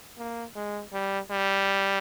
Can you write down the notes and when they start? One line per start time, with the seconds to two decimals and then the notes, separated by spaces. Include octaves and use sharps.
0.18 A#3
0.56 G#3
0.93 G3
1.30 G3